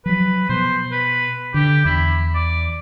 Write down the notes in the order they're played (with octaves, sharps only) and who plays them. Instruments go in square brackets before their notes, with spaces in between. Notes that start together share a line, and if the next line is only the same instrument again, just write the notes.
[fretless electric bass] F3 F#3 [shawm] B4
[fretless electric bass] B2 [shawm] C5
[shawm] B4
[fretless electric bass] D3 [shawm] G4
[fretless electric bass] E2 [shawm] E4
[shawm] D5